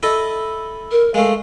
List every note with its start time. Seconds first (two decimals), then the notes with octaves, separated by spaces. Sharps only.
0.03 E4 A4 D#5
0.92 A#4
1.14 G#3 A3 F5